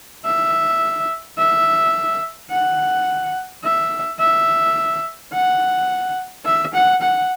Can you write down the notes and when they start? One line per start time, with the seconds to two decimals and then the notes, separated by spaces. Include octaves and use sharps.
0.25 E5
1.38 E5
2.51 F#5
3.64 E5
4.20 E5
5.33 F#5
6.45 E5
6.74 F#5
7.02 F#5